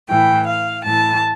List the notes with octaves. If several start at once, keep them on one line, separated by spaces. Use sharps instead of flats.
A2 E3 G5
F5
A2 E3 A5